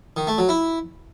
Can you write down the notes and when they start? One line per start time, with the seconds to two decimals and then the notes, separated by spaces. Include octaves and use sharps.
0.17 D#3
0.27 A3
0.38 F#3
0.49 E4